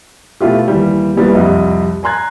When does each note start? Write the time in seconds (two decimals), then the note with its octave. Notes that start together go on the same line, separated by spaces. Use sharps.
0.41 B2 A3 E4 F4 G4
0.68 D#2 E3 G3
1.17 A#2 E3 G3 B3
1.35 C2 F2 G3 D#5
2.03 G#5 A#5 C6 F#6 G#6